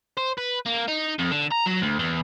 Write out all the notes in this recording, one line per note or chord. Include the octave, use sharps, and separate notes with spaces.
C5
B4
A#3
D#4
F2
D3
A#5
F#3
D2
E2